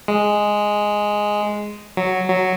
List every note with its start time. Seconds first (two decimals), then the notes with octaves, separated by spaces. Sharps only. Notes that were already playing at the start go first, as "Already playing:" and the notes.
0.08 G#3
1.97 F#3
2.29 F#3